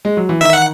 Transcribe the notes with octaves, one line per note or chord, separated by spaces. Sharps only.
G#3
F#3
E3
D#3 E5
F#5